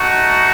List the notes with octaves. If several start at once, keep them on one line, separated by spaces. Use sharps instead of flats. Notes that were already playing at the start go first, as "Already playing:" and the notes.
Already playing: A3 D#4 F#4